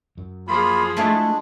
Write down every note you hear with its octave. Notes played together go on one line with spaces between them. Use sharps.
F#2
F3 A#3 F4 G#4 B5
G#3 A3 D4 E4 F4